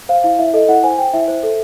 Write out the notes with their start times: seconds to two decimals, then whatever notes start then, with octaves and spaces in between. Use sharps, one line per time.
0.09 C5 F5
0.23 E4 F5
0.39 E4 E5
0.54 A4 D#5
0.69 E4 F#5
0.83 C5 G#5
0.98 C5 G5
1.14 E4 E5
1.28 C5
1.43 A4